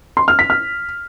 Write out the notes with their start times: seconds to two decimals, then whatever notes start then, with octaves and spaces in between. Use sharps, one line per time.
0.17 C6
0.28 F6
0.39 B6
0.50 F6